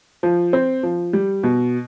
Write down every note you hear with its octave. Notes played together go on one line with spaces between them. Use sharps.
F3
C4
F3
G3
B2